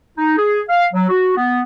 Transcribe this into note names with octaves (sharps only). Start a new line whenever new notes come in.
D#4
G#4
F5
F#3
F#4
B3